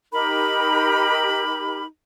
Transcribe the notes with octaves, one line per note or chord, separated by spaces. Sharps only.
D#4 G4 A#4 B5